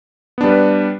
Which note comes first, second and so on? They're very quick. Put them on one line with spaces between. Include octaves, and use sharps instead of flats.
B3 D4 G3 B4